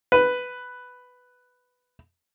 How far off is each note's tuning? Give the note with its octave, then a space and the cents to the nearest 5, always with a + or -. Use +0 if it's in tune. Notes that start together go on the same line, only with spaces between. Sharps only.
B4 +5